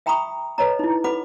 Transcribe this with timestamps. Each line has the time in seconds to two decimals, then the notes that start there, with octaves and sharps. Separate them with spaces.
0.06 E5 G5 A#5 B5 C#6 D#6
0.58 A4 B4 C#5 D#5 A#5
0.79 D#4 E4
1.04 A4 B4 F#5 B5 D6